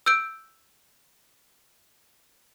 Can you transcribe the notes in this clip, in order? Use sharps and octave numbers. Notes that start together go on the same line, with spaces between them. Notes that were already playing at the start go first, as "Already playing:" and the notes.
E6 G6 D7